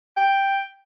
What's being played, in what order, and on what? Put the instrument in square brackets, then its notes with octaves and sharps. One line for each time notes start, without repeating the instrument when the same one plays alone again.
[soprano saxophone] G5